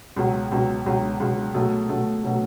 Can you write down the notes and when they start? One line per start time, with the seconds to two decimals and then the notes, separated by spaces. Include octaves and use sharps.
0.16 C#2 B2 F#3
0.52 C#2 B2 F#3
0.86 C#2 B2 F#3
1.20 C#2 B2 F#3
1.54 B2 F#3 A3
1.89 B2 F#3 A3
2.23 B2 F#3 A3